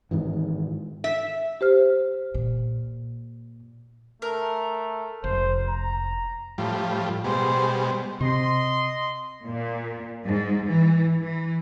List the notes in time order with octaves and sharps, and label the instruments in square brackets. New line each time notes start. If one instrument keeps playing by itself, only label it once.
[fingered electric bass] G#2 D#3 E3
[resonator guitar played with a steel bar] E5
[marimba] G4 C5 F6
[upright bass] A#2
[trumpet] A3 [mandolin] A#4
[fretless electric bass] F1 [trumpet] C5
[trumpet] A#5
[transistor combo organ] A2 F3 G3
[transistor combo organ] B2 G3 G#3 [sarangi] C5
[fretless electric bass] C3 [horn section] D#5 C6
[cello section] A#2
G#2
E3
E3